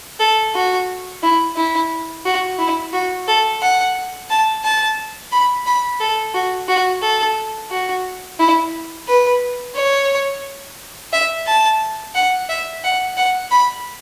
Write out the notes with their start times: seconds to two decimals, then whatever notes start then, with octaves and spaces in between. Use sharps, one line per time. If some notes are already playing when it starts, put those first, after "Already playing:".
0.20 A4
0.55 F#4
1.23 E4
1.56 E4
2.25 F#4
2.59 E4
2.93 F#4
3.28 A4
3.62 F#5
4.30 A5
4.64 A5
5.32 B5
5.66 B5
6.00 A4
6.34 F#4
6.68 F#4
7.02 A4
7.71 F#4
8.39 E4
9.08 B4
9.76 C#5
11.13 E5
11.47 A5
12.15 F#5
12.49 E5
12.84 F#5
13.17 F#5
13.51 B5